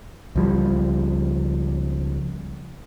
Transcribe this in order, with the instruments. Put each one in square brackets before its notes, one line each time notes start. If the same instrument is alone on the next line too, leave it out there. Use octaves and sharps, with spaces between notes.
[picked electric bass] C#2 F3 G3